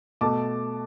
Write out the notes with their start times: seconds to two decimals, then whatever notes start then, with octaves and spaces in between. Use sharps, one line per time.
0.21 B2 A3 A5 D6